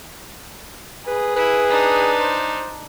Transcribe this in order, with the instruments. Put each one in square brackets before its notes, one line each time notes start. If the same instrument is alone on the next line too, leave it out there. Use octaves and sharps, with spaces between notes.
[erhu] G#4 [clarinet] B4
[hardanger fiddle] E4 [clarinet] B4
[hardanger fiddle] D4 D#4
[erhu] C5